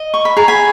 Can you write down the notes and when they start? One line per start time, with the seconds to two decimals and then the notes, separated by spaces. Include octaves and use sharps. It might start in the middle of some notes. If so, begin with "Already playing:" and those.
Already playing: D#5
0.14 C#6
0.25 B5
0.37 G#4 A#5
0.48 G#5 B5